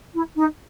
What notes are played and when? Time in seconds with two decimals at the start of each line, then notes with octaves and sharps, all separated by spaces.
0.14 E4
0.36 D#4